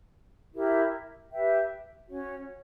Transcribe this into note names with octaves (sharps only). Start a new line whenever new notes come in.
E4 G4 A#4
G4 B4 E5 G5
C#4 F#4 C#5